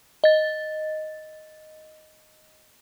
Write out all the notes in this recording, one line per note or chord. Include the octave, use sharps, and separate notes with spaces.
D#5 A6